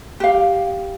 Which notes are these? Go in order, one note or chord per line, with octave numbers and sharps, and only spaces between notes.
G4 F5